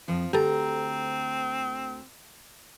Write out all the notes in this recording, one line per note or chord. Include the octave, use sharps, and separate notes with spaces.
F2 F3
D2 C4 G4 A4 A#5